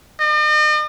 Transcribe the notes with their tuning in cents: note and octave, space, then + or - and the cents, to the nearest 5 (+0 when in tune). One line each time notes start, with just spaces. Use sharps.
D#5 -45